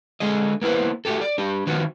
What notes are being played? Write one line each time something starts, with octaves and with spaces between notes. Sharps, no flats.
D3 G#3 G#4 D#5
A#3 B3 E4 B4 C5
A3 F#4 G4 A4
D5
D4 G4
D#3 F3 F#3 B3 F#4